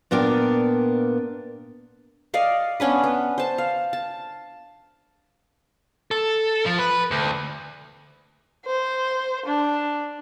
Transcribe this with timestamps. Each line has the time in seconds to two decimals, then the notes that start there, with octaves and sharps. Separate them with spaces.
0.11 A#2 B3 D4 A#4 G5
2.34 D5 D#5 F5 C#6
2.80 B3 C#4 D4 B4
3.04 B3
3.38 C5 A5
3.58 F5
3.93 A5
6.11 A4
6.66 F3
6.79 B4
7.11 D2
8.66 C5
9.46 D4